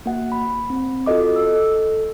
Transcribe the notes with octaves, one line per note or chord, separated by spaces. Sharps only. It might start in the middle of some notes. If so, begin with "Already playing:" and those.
A#3 F#4 F#5
B5
C4
F4 F#4 A4 D#5 D6
A4 E6
A4